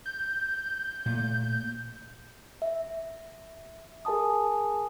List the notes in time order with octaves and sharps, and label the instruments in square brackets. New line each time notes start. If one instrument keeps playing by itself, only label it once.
[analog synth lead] G6
[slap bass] A#2 A3
[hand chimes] E5
G#4 A#4 G#5 A5 D#6